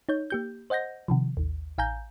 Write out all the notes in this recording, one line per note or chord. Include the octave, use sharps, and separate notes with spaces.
D#4 C#5 G6
A#3 G4 G6
C5 D#5 F#5 G6 A#6
C3 D#3 F3
A1 D#2
A1 F5 G#5 A#5 G6